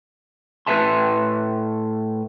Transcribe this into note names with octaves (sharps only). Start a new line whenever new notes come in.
A2 G4 B4 E5 A5 C6